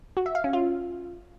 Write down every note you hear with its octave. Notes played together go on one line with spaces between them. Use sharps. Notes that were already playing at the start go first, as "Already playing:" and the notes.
F#4
E5
F5
C#4
F4